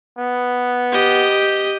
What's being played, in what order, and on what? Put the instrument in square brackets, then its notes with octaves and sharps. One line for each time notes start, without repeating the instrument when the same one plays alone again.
[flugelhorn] B3
[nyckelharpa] G4 D#5